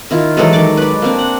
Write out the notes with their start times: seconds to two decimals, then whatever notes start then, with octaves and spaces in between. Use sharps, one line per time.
0.11 D#3 E4 F4
0.37 E3 F#3 G#3 A4
0.53 D#3 D5 D6
0.77 B4 D5
1.02 A#3 C4 D4
1.18 F#5